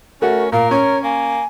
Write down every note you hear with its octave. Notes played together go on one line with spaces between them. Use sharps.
A3 C#4 F#4 A#4
A#2 A#4 F5
C#4 C#5
A#3 G#5